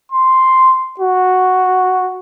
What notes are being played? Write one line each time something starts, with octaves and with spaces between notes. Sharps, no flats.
C6
F#4